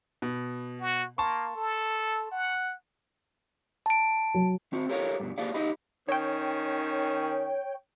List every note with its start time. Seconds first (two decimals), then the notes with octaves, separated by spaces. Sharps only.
0.22 B2
0.81 F#4
1.18 A#3 A5 C6 C#6
1.56 A4
2.31 F#5
3.86 A5 D7
4.35 F#3
4.73 C4 F#4
4.89 G4 A4 A#4 C#5 F5
5.20 G2 B2
5.38 A#3 G4 G#4 D5 F5
5.54 D#4 G4 D#5 B5
6.09 D#3 C#4 C#5 G5